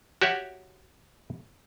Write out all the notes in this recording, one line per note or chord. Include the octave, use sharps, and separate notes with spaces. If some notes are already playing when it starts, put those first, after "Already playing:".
F#4 G4 C#5 E5 F#5